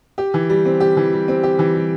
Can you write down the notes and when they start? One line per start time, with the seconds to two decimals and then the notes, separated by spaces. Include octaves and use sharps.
0.18 G4
0.34 E3
0.50 G3
0.66 C4
0.80 G4
0.97 E3
1.13 G3
1.28 C4
1.43 G4
1.59 E3
1.75 G3